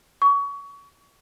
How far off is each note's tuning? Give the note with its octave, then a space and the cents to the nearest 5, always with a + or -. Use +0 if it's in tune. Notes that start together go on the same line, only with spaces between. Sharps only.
C#6 +25